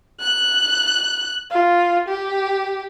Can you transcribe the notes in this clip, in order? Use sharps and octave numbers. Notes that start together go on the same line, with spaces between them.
F#6
F4
G4